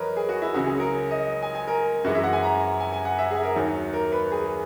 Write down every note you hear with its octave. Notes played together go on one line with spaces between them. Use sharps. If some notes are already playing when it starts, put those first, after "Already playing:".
Already playing: E2 F#3 A#4 B4 C#5 D#5
G#4
F#4
E4
C#2 C#3 F#3 F#4
G#4
A#4
D#5
G#5
G#5
A#4
F#2 E3 G#3 F#4
E5
F#5
G#5
A#5
G#5
G#5
F#5
E5
G#4
A#4
D#2 D#3 F#3
A#4
B4
G#4